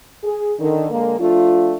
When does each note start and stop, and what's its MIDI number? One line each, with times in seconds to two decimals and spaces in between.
0.24 0.53 68
0.59 0.89 50
0.59 0.89 51
0.91 1.20 50
0.91 1.20 56
0.91 1.20 58
1.20 1.75 53
1.20 1.75 57
1.20 1.75 62
1.20 1.75 65